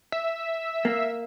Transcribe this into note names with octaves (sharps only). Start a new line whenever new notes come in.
E5
A#3